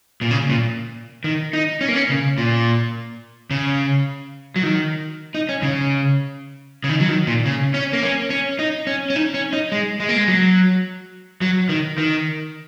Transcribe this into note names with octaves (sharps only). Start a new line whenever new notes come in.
A#2
C#3
A#2
D#3
D#4
C#4
A#3
C#4
C#3
A#2
C#3
F#3
D#3
D#4
C#4
C#3
C#3
D#3
F#3
D#3
A#2
C#3
C#4
A#3
C#4
C#4
D#4
C#4
C#4
D#4
C#4
D#4
G#3
G#3
A#3
G#3
F#3
F#3
D#3
D#3